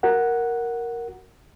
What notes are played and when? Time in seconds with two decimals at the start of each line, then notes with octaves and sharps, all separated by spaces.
0.03 F#4 A#4 F#5